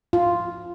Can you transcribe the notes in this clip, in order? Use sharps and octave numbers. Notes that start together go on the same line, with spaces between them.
F4